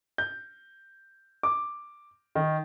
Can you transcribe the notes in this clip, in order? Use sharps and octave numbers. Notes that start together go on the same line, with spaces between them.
G6
D6
D#3